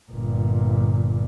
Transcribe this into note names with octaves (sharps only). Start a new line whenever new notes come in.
G1 A#2